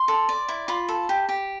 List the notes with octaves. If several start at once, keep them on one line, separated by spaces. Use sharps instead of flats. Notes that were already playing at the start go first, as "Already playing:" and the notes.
Already playing: C6
A4
D5
E4
F4 B5
A4
G4
G4